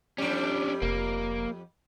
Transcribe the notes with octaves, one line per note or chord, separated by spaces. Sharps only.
F2 G3 C#4 D4
F1 A#3